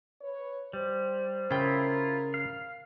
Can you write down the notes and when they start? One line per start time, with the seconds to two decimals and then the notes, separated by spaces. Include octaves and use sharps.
0.22 B4 C#5
0.73 G3 C5
1.51 C#3 E4 F4 A#4 G5
2.34 F5